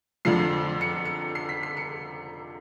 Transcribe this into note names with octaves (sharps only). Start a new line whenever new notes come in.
F2 D3 F3 C7
C#7
C#7
C7
B6
C7
C#7